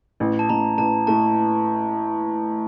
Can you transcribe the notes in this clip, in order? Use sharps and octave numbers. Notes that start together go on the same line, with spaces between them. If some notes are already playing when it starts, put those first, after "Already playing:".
A1
A5
A1 A#5
A1 A5
A2 A5